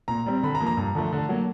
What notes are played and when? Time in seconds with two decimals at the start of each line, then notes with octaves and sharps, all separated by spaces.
0.08 A#2 A#5
0.26 G3 C4
0.43 D3 B5
0.55 A#5
0.60 F3 A#3
0.67 A#5
0.77 G2
0.95 D3 F3 A3
1.12 D3
1.29 F#3 A#3